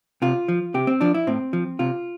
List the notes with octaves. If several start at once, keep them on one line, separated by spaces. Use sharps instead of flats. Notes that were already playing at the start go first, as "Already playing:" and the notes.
C3 F4
F3
C3 G4
C4
F3 D4
E4
A2 C4
F3
C3 F4